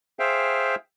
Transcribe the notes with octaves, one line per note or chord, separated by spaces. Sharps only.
G#4 C5 E5 F5 G5